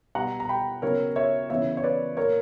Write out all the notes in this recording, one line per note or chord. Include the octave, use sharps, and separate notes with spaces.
B2 G3 B3 F#5 A#5
A#5
G5 B5
C#3 F#3 B3 A#4 C#5
C#5 E5
C#3 E3 B3 C#5 E5
C#5
B4 D5
A#2 A#3 A#4 C#5